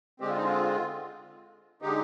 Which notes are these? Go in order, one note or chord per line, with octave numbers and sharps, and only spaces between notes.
D3 G#3 C4 G4
F4
D#4
F4
D3 G#3 D#4 G4